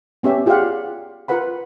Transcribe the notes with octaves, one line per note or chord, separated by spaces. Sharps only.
B3 C#4 G4 E5
F4 G4 G#4 D5 F5 F#5
F4 A#4 B4 F#5 B5